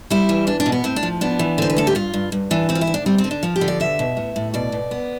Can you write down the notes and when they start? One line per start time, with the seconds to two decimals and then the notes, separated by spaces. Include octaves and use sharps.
0.10 G3 E4
0.29 E3
0.47 E2 D4
0.60 D4
0.66 B2
0.72 B3
0.84 A2 C4
0.96 D4
1.03 F3
1.21 B3 D4
1.39 E3
1.58 D3 C5
1.70 B4
1.77 D2 A4
1.87 G4
1.95 G2 F4
2.14 G2
2.32 G2
2.51 E3 D4
2.69 D2 C4
2.75 F4
2.81 E4
2.87 D2
2.94 D4
3.06 G3 C4
3.18 C4
3.24 D3
3.31 D4
3.43 F3 F4
3.56 G4
3.61 D3
3.68 D5
3.80 B2 E5
3.99 B2
4.17 A2
4.36 A2
4.54 B2 D5
4.72 B2
4.91 B3